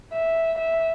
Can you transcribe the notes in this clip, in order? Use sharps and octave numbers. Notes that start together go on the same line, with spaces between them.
E5
E5